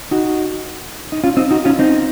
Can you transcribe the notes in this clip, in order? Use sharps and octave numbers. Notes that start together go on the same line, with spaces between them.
D#4 F#4
D#4
C#4 F4
C4 D#4
D#4 F#4
C#4 F4
C4 D#4